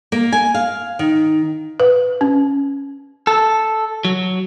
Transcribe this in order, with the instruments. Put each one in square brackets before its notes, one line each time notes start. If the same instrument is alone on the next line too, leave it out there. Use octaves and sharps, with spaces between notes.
[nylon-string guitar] A#3
G#5
F5
D#3
[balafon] B4
C#4
[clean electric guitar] A4
F#3